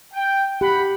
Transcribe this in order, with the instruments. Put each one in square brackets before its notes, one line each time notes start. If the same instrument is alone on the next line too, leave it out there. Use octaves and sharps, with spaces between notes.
[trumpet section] G5
[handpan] G4 [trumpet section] F#5 B5